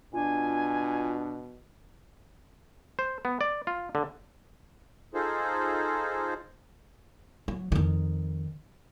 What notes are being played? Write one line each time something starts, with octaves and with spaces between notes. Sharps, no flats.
B2 D4 F4 G#5
C5
B3
D5
F4
D3
D#4 F4 G#4 A4 C5
F#3
F2 D#3